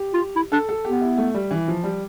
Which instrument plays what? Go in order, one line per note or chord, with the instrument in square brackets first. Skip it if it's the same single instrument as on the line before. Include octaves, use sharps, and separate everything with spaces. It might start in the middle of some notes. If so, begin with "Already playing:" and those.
Already playing: [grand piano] G4
[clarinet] F4
E4
[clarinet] D4 [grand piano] A4
[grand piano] A4
[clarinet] B3 [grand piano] G4
[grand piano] E4
A3
G3
E3
F3
G3